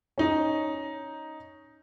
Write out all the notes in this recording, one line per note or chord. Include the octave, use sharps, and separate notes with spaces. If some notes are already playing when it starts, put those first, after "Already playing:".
C#4 D#4